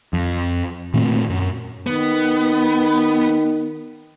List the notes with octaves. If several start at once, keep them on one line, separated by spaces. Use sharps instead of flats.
F2
A#2 D#3 A3 C4
F#2
D#3 B3